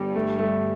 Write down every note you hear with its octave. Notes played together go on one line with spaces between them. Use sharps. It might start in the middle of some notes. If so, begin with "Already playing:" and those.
Already playing: G1 G2 G3
A3
A3